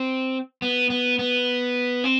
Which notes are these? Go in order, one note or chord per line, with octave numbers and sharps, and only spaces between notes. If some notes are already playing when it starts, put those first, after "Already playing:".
Already playing: C4
B3
B3
B3
C4